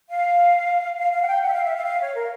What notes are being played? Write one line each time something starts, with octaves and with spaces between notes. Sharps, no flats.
F5
F5
F5
F#5
G5
F#5
E5
F5
E5
F5
F5
C#5
A#4